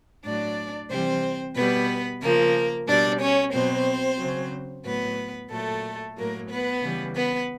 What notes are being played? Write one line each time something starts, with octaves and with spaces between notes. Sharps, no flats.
A2 F#3 D4 D5
C3 E3 G3 C4 C5
B2 G3 B3 B4
C#3 F3 A#3 A#4
B2 G3 D4 D5
C#4 C#5
B2 F#3 C4 C5
C#3 F#3
A2 F#3 B3 B4
A#2 F#3 A3 A4
A2 F#3 A#3 A#4
B3 B4
C#3 E3 G3
B3 B4